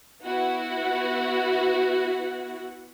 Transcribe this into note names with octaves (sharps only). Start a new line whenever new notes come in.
B3 E4 F#4 F#5